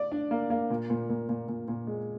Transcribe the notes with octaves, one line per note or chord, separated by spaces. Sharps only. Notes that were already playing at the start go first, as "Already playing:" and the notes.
Already playing: D5
D4
A#3
A#3
A#2
A#2
A#2
A#2
A#2
A#2
G#3